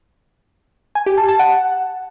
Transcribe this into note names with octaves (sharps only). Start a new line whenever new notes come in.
G#5
G4
A5
A5
F#5